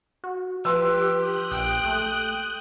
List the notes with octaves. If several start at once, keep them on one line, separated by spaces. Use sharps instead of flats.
F#4
F3 G4 B4 C6 E6
D#6 F#6 G6
A#1 G5
A3